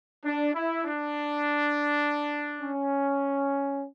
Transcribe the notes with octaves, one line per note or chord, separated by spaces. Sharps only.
D4
E4
D4
C#4